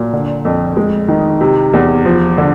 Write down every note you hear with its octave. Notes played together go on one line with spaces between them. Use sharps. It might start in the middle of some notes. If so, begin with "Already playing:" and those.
Already playing: A#2 F#3
D3
F2
G#3
D#3
C3
E2
F3
D3